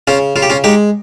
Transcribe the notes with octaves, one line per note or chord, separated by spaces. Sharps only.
C#3 C#4 F4
C#3 F4
G4
C#4 F4
G#3 D#4 G4